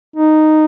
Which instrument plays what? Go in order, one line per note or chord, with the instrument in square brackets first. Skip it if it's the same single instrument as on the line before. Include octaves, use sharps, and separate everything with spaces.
[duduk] D#4